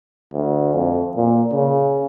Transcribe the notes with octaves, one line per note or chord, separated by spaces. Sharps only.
D2
F2
A#2
C#3